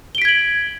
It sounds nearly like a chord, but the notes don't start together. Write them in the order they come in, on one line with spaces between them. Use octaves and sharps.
G7 D7 B6 G#6 F#7